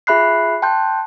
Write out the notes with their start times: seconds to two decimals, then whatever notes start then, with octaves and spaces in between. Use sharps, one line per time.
0.07 F4 G#4 E5 B5 F#6 C7
0.62 G5 A5 C6 F#6 G6